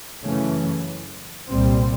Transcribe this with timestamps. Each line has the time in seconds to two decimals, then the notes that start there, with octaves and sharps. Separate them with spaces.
0.23 F#2 C#3 E3 A3 C#4
1.50 C2 A#2 G3 C4